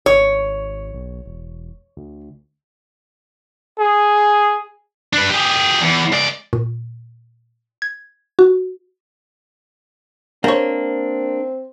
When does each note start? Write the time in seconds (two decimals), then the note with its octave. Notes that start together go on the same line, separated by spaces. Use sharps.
0.06 G#1 C#5
0.94 B1
1.26 E1
1.97 D2
3.79 G#4
5.13 D4 B4
5.30 G4 G#4
5.81 E2
6.13 G#2 D5
6.53 A#2
7.82 G#6
8.39 F#4
10.44 A#3 C4 D4 C5 C#5